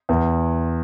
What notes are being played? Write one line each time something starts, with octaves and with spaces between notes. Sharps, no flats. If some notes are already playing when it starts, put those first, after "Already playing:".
E2